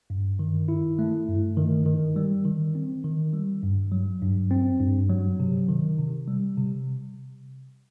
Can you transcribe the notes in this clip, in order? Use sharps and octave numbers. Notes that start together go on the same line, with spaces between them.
G2
D#3
E4
A3
G2
D#3
D#3
G3
D#3
C4
D#3
G3
G2
F#3
G2
C4
G2
F#3
C3
D#3
C3
G3
C3